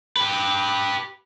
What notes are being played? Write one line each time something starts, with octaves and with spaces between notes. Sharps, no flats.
G4 B4